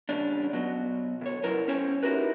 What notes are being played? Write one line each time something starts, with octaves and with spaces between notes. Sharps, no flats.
E2 C#3 G3 C#4 D4
B2 F#3
D2 C#5
C2 F#2 F#3 E4 A#4 B4
C#4 A4 C5 C#5 G5 G#5
D#4 E4 F#4 G4 A#4 B4